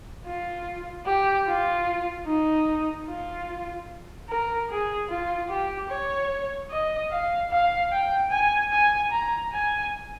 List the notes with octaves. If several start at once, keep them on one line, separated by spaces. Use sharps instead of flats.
F4
G4
F4
D#4
F4
A#4
G#4
F4
G4
C#5
D#5
F5
F5
G5
G#5
G#5
A#5
G#5